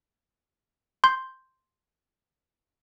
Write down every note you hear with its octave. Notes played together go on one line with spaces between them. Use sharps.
C6 G6